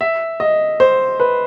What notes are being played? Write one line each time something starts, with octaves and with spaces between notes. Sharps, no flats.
E5
D#5
C5
B4